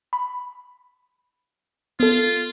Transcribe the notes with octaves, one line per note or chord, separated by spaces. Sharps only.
B5
B3 F4 A4